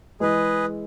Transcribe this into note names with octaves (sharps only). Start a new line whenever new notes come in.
E3 G#3 G#4 B4 D#5